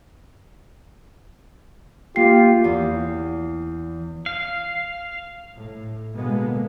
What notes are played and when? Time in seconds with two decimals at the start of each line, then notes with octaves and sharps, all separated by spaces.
2.16 A#3 F4 G4 G5 C7
2.64 E2
4.26 F5
5.56 A2
6.14 B2 D3 G#3 A#3 B3